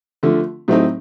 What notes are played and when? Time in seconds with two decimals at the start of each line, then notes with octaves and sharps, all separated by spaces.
0.23 D3 F3 A3
0.68 A2 F#3 A3 C4 D#4